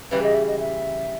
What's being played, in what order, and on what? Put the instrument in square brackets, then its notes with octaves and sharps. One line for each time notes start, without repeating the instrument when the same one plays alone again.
[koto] C#3 E3 G3 [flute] B4
[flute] D#5
E5
D#5
E5